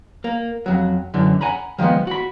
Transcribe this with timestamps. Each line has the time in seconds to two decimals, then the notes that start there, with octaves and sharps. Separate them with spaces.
0.24 A#3
0.66 F2 F#3
1.14 F#2 D3 E3
1.41 F#5 G#5 A#5 B5
1.79 D#3 F3 F#3 G#3 B3
2.07 F#4 B5